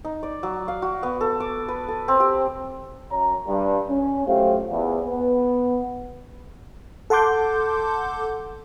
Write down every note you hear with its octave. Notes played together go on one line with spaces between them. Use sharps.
D#4
D5
F#3
F5
F#4
B3
A4
D6
B4
A4
C4
G4
F#2 C#5 A#5
G2
C#4
F#3 A3 F4 G4 C5 F5
E2
B3
A4 F#5 A5 C6 D6 G6